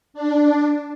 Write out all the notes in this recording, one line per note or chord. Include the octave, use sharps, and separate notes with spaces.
D4